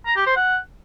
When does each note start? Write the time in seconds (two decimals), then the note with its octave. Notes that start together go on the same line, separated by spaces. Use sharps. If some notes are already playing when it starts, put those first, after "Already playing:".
0.06 A#5
0.16 G4
0.26 C5
0.36 F#5